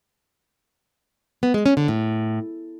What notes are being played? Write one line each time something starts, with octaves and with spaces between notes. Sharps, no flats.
B3
G#3
C#4
D3
A2